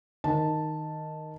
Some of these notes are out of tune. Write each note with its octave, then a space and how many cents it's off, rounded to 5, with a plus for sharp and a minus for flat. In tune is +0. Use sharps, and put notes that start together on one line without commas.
D#3 +0 A5 +0